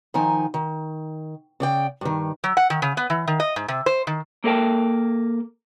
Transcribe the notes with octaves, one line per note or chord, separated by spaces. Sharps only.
D#3 F3 D#4 G#5
D#3
C#3 D5 G5
G2 D#3
F#3
F#5
D#3
C#3
B3
E3
D#3
D#5
G#2
C3
C5
D#3
A#3 A4 A#4 C#5 G5 A5